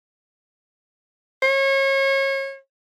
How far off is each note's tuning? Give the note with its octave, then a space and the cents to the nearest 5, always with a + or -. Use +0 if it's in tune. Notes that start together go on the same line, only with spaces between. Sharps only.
C#5 -30